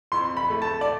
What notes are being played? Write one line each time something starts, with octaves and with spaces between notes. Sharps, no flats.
F2 C6
B5
A3
A5
D5